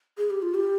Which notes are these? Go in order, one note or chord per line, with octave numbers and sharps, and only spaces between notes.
G#4
G4
F4
G4